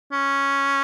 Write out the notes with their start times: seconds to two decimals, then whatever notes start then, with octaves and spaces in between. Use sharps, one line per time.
0.12 C#4